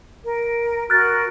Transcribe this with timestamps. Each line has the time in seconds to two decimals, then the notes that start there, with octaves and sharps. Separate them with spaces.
0.25 A#4
0.90 F#4 A#4 F6 F#6 A6